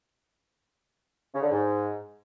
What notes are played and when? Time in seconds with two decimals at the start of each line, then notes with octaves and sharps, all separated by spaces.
1.34 C#3
1.42 D3
1.51 G#2